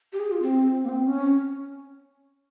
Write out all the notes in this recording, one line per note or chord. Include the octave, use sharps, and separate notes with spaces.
G4
G#4
F4
C4
A#3
C4
C#4